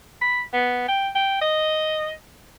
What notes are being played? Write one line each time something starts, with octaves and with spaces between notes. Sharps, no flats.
B5
B3
G5
G5
D#5